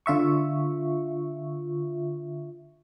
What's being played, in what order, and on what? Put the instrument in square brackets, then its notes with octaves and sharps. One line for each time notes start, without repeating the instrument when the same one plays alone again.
[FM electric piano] D3 F4 E5 C#6